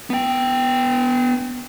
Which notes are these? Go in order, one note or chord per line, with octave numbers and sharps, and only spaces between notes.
B3 G5